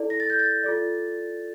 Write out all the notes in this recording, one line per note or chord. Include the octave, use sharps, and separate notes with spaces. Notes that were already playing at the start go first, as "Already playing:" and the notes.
Already playing: E4 A4 D5
A#6
A6
G6
A6
F4 A4 D5